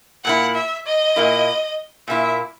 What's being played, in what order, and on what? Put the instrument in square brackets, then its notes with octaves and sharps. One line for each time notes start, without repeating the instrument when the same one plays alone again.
[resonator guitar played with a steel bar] A#2 A#3 E4 [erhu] F#5
[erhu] E5
D#5
[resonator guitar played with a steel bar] A#2 A#3 E4
[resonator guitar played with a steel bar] A#2 A#3 E4 [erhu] E5